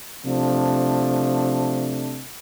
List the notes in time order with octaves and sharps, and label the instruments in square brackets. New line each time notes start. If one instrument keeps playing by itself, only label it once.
[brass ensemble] C3 F3 A3 D4